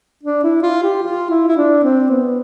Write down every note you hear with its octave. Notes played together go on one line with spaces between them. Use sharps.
D4
E4
F4
G4
F4
E4
E4
D4
C4
B3